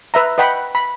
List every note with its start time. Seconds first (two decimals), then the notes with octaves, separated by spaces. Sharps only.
0.14 B4 E5 A#5
0.38 B4 D#5 F#5 G5 B5
0.75 B5